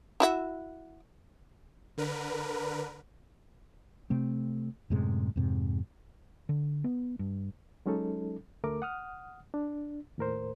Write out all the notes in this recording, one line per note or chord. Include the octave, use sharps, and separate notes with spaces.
E4 F#4 E5
D3 A#4 B4
C3 A3 C4
F#2 A2 C3 G#3
F2 G#2 C3
D3
B3
G2
F#3 G#3 C#4 D#4 A4
D2 A3 A#4 D6
F#5 D#6 F6
D4
D#2 A2 A#4 C5